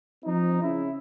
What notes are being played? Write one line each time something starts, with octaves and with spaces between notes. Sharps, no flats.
F3 C4 D#4
C#3 E4